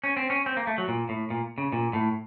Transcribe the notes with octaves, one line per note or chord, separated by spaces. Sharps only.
C#4
C4
C#4
C4
A#3
A3
F#3
A#2
A2
A#2
C#3
A#2
A2